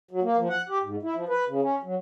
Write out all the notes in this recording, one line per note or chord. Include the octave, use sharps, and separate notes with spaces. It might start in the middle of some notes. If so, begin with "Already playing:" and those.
F#3
A#3
F3
F#5
G4
G#2
E4
F3
B4
C#3
C#4
F#3